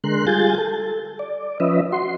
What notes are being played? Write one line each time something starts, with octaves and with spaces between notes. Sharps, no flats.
D3 G#3 A#4 C6 F#6
G3 F4 G#4 G#5 G6 A6
A4
D5
F3 C#4 B4 D#5 E5
F#4 C6